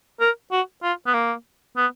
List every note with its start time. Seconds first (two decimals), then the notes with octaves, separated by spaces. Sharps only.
0.20 A#4
0.52 F#4
0.83 F4
1.07 B3
1.14 A#3
1.77 B3